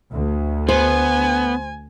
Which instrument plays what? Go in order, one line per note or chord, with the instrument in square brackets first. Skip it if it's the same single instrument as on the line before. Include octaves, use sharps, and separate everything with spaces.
[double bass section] D2
[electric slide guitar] B3 [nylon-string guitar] C5 [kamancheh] G#5